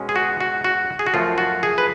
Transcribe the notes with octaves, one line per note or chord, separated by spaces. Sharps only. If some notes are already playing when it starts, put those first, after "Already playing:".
Already playing: B2 G#3 C#4
G#4
F#4
F#4
F#4
G#4
F#4
F#2 F3 A3 F4
F#4
G#4
B4